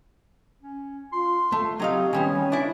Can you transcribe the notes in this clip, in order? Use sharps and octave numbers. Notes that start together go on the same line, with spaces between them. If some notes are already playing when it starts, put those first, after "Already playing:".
C#4
F4 C6
A3
F#3 C4 D#4 G4 F5
D#3 G3 B3 C#4 G#5
D4 E4 D5